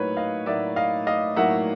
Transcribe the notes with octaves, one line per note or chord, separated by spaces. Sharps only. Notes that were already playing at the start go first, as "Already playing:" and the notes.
Already playing: A2 F#3 A#3 D#4 B4 C#5
D#5 F5
A2 F#3 A#3 D#4 D5 E5
D#5 F5
D#5 F5
A2 F#3 A#3 D#4 E5 F#5